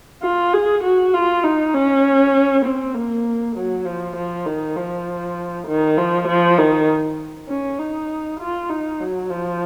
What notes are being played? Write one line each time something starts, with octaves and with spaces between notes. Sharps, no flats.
F4
G#4
F#4
F4
D#4
C#4
C4
A#3
F#3
F3
F3
D#3
F3
D#3
F3
F3
D#3
C#4
D#4
F4
D#4
F#3
F3